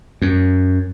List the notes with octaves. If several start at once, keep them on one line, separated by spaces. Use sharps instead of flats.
F#2